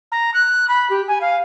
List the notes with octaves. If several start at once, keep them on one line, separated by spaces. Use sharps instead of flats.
A#5
F#6
B5
G4
G#5
F5